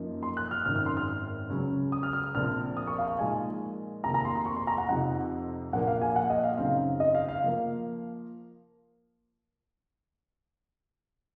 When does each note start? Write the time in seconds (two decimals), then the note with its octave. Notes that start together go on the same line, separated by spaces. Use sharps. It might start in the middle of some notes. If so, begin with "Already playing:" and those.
Already playing: F#2 F3 A#3 D#4
0.23 C6
0.37 F#6
0.51 F6
0.65 G#1 F#2 D#3 F6
0.76 F6
0.86 C6
0.97 F6
1.50 C#2 C#3 F#3 C#4
1.92 D#6
2.03 F6
2.13 F6
2.35 A#1 A#2 F3 C4 F6
2.77 D#6
2.87 C#6
2.98 F5
3.09 F5
3.19 A#2 F3 G#3 D#4 G#5
4.04 F2 C3 D#3 A#3 A#5
4.14 A#5
4.25 C6
4.35 C6
4.46 C#6
4.56 C6
4.67 A#5
4.78 F#5
4.89 F2 C3 F3 C4 D#4 F#5
5.73 A#1 A#2 F3 A#3 F#5
5.87 F5
6.01 G#5
6.16 F#5
6.30 D#5
6.44 F5
6.58 F#2 C#3 F#3 C4 D#4 F5
7.00 D#5
7.15 F5
7.29 F5
7.44 F3 A#3